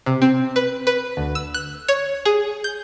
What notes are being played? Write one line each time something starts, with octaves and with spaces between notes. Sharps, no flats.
C3
C4
B4
B4
D2
E6
F#6
C#5
G#4
G6